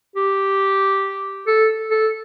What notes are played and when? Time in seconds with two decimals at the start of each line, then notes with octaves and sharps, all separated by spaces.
0.16 G4
1.47 A4
1.91 A4